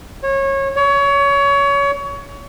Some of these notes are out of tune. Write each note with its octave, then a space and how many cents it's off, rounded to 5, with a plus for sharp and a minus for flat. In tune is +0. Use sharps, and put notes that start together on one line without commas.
C#5 -25
C#5 +25